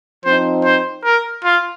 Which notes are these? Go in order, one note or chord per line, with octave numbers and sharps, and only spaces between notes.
F3 C4 D#4 C5
C5
A#4
F4